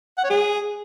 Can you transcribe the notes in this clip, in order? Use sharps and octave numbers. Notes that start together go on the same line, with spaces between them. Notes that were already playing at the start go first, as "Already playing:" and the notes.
F#5
C#5
G#4